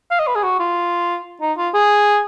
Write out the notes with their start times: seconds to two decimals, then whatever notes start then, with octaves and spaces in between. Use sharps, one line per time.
0.11 F5
0.19 D#5
0.27 B4
0.35 G#4
0.43 F#4
0.60 F4
1.41 D#4
1.58 F4
1.74 G#4